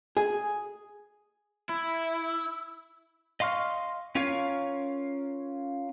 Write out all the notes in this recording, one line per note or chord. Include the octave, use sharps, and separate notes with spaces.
G#4
E4
D#5 F5 C6 C#6 F6
C#4 F4 A#4 C#5 F5